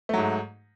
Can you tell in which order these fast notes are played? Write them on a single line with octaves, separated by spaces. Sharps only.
A3 F#3 G#2